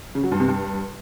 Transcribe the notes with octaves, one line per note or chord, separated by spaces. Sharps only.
C#3
F#3
G2
C3
G2